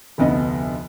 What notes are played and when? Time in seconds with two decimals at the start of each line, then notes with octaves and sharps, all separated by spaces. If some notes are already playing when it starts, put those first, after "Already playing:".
0.18 F1 D2 B3 D#5